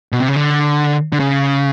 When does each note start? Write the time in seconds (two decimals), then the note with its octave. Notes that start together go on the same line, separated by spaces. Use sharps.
0.12 B2
0.20 C3
0.28 C#3
0.36 D3
1.13 D3
1.20 C#3